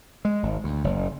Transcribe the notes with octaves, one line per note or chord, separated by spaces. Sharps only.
G#3
G#1
D2
F#1